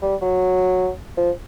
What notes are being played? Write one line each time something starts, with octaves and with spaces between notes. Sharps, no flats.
G3
F#3
F3